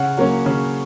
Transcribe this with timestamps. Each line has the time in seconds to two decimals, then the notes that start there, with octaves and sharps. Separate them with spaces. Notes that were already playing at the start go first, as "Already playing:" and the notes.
Already playing: C#3 F#5
0.17 F#3 A#3 C#4
0.46 C#3